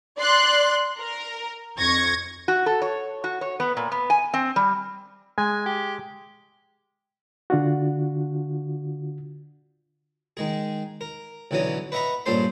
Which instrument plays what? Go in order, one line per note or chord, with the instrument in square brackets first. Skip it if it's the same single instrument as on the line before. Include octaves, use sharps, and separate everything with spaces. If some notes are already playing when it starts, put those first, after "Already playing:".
[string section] D5 C6 F#6
A#4
F2 C#6 G#6 A#6
[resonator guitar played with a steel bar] F#4
A4
C#5
F#4
C#5
B3
A#2
B3
G#5
C4
G3
[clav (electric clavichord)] G#3 [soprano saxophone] G#5
[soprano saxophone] G4
[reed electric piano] D3 D4 F4 F#4
[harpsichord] D#3 G#3 G#4
A#4
B1 D3 E3 F#3 C#4 D#6
B4 D#5 E5 F#5 A#5 B5
G2 A#2 C#4 A4 C5 C6